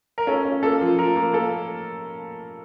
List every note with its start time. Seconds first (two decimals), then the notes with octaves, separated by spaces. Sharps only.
0.18 A#4
0.27 C#4 A4
0.45 C#4
0.63 A#3 A4
0.81 F3
0.98 F3 A#4
1.16 A#3
1.33 A#3 A4